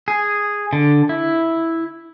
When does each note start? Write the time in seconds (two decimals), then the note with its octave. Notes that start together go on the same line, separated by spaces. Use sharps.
0.08 G#4
0.73 D3
1.09 E4